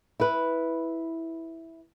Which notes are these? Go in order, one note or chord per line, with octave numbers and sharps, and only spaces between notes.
E4 B4